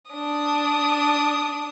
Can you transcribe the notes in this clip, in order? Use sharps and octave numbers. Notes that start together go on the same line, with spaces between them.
D4 D#6